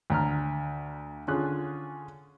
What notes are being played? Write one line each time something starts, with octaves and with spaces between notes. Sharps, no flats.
D2 A#5 F6
D3 C#4 F4 G#4 F#6